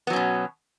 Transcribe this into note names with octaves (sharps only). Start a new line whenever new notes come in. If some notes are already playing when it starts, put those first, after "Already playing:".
B2 F#3 B3 C#4